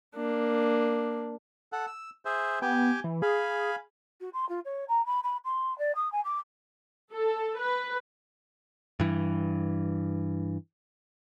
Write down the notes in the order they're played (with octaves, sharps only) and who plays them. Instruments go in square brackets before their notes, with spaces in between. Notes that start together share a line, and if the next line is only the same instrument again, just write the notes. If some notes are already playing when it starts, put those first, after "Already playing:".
[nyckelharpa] A#3 D4
[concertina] A4 F#5
E6
G#4 C5 E5
[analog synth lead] B3 [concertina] G4 G5 G#5
[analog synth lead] E3
[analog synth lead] G#4 [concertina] F5 G#5 B5
[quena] F#4
C6
F4
C#5
A#5
B5
B5
C6
D5
D#6
G#5
D6
[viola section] A4
B4
[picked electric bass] G2 E3